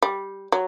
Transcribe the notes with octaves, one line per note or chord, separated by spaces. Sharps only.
G3
F#3